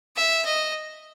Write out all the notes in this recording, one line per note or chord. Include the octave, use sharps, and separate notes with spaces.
E5
D#5